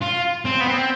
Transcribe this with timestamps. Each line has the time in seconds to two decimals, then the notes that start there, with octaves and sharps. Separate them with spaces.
0.02 F4
0.46 C4
0.61 B3
0.67 C4